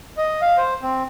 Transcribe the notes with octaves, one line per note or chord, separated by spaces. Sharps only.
D#5
F5
C5
C4